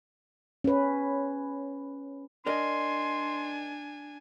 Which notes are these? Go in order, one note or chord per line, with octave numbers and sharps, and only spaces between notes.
C#4 B4
D4 A#4 D5 D#5 G#5 C6